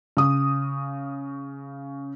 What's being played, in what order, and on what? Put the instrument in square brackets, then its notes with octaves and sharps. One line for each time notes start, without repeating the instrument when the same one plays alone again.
[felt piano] C#3 D#6